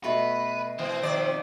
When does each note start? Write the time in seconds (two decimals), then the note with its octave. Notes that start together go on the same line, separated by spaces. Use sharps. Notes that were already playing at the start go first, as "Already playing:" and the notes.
0.04 B2 A3 B4 A#5
0.79 E3 C4 G#5
1.02 D#3 F3 D5